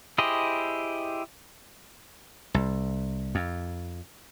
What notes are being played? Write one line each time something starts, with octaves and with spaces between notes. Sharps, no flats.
E4 G4 G#4 C5 D#5
C2
F2